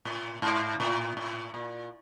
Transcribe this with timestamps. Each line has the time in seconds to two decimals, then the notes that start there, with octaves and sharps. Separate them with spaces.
0.05 A2
0.42 G#2
0.80 A2
1.17 A2
1.54 A#2